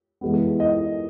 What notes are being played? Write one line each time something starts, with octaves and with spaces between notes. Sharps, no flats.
E3 G#3 B3
D#5